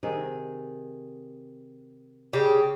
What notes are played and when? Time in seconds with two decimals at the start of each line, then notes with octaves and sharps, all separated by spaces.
0.03 C3 D#3 G#4
2.33 C#3 G4